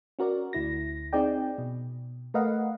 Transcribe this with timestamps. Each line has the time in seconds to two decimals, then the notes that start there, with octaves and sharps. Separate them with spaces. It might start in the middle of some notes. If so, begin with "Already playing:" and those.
0.19 C#4 F#4 A#4 D5
0.53 D2 E4 A#6
1.13 C4 D#4 G#4 D5 G5
1.58 B2
2.34 A3 A#4 B4 D#5 F5 F#5